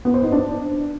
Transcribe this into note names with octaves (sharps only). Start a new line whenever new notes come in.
B3
C5
D#4
D4